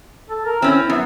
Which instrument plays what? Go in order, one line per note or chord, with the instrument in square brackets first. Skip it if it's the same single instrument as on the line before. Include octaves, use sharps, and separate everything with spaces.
[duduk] A4
A#4
[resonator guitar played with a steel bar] C4 C#4 [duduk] E4
[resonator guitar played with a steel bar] F#2 [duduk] B3